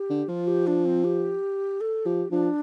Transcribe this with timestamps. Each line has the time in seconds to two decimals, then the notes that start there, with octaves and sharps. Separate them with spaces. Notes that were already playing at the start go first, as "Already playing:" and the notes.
Already playing: G4
0.10 D3
0.28 F3 F4
0.47 G4
0.67 D4
0.85 C4
1.04 G4
1.81 A4
2.05 F3 G4
2.31 F3 D4